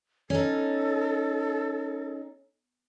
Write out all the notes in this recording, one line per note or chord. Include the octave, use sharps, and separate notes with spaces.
C#4 D#4 A4